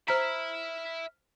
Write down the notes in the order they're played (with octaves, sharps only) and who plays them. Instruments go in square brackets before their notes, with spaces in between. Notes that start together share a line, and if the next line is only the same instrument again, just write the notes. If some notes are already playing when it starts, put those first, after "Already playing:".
[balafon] C5 A#5 [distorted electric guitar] E5 B5 [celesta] F6 B6